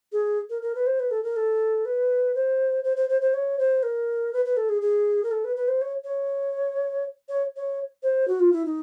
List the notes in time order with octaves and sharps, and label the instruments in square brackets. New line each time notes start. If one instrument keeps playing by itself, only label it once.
[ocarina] G#4
A#4
A#4
B4
C5
B4
A4
A#4
A4
B4
C5
C5
C5
C5
C5
C#5
C5
A#4
B4
B4
A4
G#4
G#4
A#4
A4
B4
B4
C5
C#5
C#5
C#5
C#5
C5
F#4
F4
E4
D#4